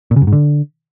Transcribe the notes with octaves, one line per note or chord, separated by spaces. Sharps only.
A#2
C#3
F#2
G#2
D3